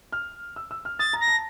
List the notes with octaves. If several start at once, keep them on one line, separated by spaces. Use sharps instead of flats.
F6
E6
E6
F6
D#6 A6
A#5
A#6
A5